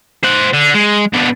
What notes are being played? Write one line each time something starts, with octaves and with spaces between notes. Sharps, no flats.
C5 F#5
D3
G#3
B2 D4